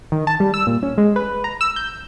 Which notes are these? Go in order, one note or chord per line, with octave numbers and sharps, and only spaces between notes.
D#3
A5
G3
E6
A#2
C#4
G#3
B4
A#5
E6
G6